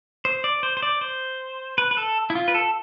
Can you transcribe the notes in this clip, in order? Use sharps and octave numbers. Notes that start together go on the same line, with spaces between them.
C5
D5
C5
C5
D5
C5
B4
B4
A4
E4
F4
B4
A4